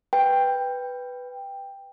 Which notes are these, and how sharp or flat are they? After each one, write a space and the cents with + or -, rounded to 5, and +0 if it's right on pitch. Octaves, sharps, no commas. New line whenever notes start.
B4 +0 G5 +10